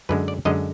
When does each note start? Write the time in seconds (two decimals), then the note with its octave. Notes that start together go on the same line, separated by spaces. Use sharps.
0.09 F#2 D3 G#3 B4
0.28 D5
0.45 F#2 D3 G#3 D#5